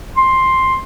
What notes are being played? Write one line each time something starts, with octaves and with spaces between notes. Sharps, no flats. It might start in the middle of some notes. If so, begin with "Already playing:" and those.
C6